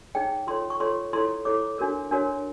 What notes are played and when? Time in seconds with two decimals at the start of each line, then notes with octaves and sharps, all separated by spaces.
0.15 D#4 G#4 C#5 G5
0.47 F4 A4 C#5 C6
0.70 C#6
0.80 F4 A4 C#5 C6
1.13 E4 A4 C#5 C6
1.45 E4 A4 C#5 D6
1.78 D4 F#4 A#4 C#5
2.11 D4 F#4 A#4 C#5